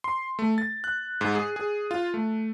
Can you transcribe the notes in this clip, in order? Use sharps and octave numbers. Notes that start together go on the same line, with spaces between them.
C6
A3
A6
F#6
G#2
G#4
G#4
F4
A3